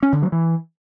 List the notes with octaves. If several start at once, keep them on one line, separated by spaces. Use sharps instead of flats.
C#4
D3
F#3
E3